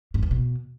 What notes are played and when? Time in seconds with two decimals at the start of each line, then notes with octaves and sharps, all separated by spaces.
0.14 G#2
0.23 E2
0.31 B2